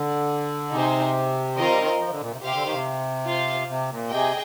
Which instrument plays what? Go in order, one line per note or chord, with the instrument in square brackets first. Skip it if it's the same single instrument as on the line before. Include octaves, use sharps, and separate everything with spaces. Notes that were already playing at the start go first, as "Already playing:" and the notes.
Already playing: [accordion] D3
[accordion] C3 [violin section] D#4 G#4 C5
[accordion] D#3 [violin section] C4 F4 A#4 D#5
[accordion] G3
D#3
F3
D3
A#2
C3
[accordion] C3 [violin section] G4 C5 F5
[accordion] D3
D#3
C3
[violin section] F4 C5 F5
[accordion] C3
A#2
[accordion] C3 [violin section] G#4 D#5 G5